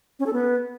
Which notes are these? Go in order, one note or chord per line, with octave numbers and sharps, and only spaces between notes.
C#4
A4
B3